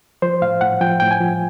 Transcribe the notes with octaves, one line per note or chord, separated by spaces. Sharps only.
F3 C5
A2 F5
A2 F#5
F3 G5
A2 G5
G#5
F3